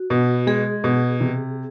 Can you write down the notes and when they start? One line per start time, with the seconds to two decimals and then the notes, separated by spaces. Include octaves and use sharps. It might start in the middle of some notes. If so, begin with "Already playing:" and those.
Already playing: F#4
0.10 B2
0.47 G#3 G#4
0.84 B2
1.21 C3